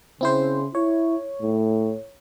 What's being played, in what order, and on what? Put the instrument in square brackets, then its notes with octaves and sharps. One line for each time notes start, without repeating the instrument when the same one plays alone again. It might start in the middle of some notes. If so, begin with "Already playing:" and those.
[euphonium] C#3 [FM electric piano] C4 E4 C5
[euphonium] E4 [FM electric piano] C#5
[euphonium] A2